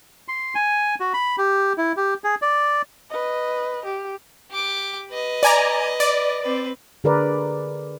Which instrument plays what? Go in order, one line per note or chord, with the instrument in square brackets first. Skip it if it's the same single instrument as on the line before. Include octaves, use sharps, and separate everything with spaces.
[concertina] C6
G#5
F#4
B5
G4
E4
G4
G#4
D5
[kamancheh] B4 D#5
G4
[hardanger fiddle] G4 D6
B4 D#5
[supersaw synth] D5 G#5 A#5
D5
[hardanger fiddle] C4 B4
[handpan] D3 G#4 A#4 B4 D5